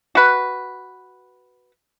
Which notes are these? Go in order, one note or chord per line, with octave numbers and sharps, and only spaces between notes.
F#4 B4